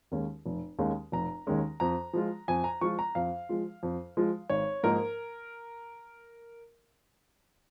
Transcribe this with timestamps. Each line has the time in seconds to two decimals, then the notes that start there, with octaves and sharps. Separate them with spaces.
0.11 D#2 D#3 G#3 C#4
0.46 F1
0.79 D#2 D#3 G#3 C#4
1.12 F1 A#5
1.47 D#2 D#3 G#3 C#4
1.80 F2 A#5
2.13 F3 G#3 F4
2.48 F2 G#5
2.64 A#5
2.81 F3 G#3 F4 C#6
2.99 A#5
3.15 F2 F5
3.49 F3 G#3 F4
3.83 F2
4.17 F3 G#3 F4
4.49 G#1 C#5
4.83 G#2 F3 A#3 D#4 A#4